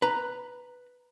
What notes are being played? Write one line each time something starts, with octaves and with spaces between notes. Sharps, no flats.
B4 A#5